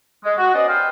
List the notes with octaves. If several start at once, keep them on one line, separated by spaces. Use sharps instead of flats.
G#3
F#4
B3 C#4 C5 D5 D#5
G4 B4 C5 F5